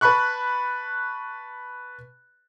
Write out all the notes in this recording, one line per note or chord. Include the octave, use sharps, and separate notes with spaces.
B4 A5 B5 C#6 F#6